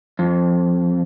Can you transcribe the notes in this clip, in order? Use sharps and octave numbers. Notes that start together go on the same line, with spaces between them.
F2